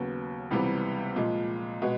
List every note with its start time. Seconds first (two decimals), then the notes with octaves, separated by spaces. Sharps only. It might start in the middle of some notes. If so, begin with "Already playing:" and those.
Already playing: D#2 C#3 F#3 B3
0.51 C#2 C3 E3 G3 B3
1.16 A#2 F3 G#3
1.82 B2 G#3 B3